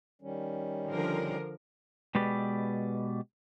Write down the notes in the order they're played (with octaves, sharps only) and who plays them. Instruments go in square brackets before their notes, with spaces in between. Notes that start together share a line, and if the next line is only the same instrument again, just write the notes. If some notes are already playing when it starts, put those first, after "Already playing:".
[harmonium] D#3 G3 C#4
[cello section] D3 F3 A#4
[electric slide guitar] B2 G#3 G4 B4 D5